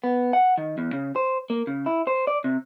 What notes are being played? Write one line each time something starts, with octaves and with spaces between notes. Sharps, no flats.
B3
F#5
D#3
E2
C#3
C5
A#3
C#3
E4
C5
D5
C3